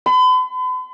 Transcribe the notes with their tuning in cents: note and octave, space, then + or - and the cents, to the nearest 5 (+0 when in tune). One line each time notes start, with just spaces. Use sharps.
B5 +45